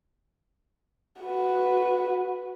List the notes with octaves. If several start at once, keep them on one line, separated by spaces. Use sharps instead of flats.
F#4 B4